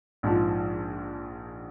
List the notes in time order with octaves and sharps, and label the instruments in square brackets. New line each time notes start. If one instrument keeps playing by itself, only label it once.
[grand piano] A#1 G#2 F3